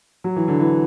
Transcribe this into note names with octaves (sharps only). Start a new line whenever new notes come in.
F#3
E3
D3
E3